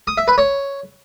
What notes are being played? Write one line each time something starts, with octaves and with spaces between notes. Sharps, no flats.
D#6
E5
B4
C#5